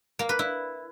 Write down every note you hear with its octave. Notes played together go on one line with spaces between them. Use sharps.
A#3
B4
E4